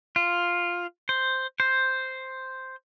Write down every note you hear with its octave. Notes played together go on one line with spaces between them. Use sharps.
F4
C5
C5